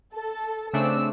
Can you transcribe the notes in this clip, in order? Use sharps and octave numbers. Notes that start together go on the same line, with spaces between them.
A4
C#3 A3 C4 D4 E6